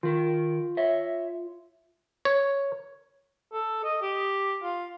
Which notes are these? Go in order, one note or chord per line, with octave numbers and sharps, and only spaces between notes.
D#3 F4 A#4
C#5 E5
C#5
A4
D#5
G4
F4